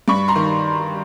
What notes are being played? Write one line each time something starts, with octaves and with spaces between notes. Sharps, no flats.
G2 B5 C#6
A#5 C6
D#3